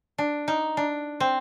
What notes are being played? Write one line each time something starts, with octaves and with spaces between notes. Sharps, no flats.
D4
D#4
D4
C4